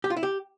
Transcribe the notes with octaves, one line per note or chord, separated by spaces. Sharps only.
G4
F4
E4
G4